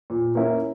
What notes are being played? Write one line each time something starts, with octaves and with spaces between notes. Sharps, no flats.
A#2
A#3 C#4 E4